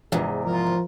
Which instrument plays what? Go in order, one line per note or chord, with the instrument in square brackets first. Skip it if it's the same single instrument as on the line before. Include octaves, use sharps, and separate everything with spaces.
[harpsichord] A#1 [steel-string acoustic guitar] E2 G#2 C3 [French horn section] G#4
[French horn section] F3 [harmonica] F4 A#4